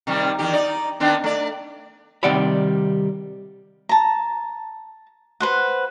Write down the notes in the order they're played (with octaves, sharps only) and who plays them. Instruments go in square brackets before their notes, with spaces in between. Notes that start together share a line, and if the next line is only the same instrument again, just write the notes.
[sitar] C3 D#3 G3
E2 D#3 G4
D#4 D5
D#3 B3 D4
A3 D5
[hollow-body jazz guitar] C3 D#3 G3 D5 F#5 B5
[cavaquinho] A5 A#5
B4 C5 F#5